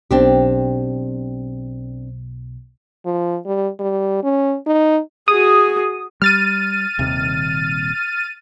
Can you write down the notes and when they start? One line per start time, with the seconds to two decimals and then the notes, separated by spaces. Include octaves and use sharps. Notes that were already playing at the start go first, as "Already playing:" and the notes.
0.11 B1 B2 C4 D4 G4
3.06 F3
3.46 G3
3.79 G3
4.23 C#4
4.66 D#4
5.28 F#4 G#4 D#6
6.22 G3 F6 A6 D#7
6.99 D#1 D#2 C3